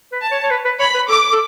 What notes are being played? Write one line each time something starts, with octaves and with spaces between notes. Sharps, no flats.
B4
A5
C#5
C#5
B4
B4
C#5 B5
B4
A4 D6
A4